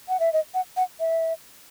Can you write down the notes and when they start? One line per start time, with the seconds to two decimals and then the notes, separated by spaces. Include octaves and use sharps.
0.09 F#5
0.20 E5
0.33 D#5
0.54 F#5
0.77 F#5
1.00 E5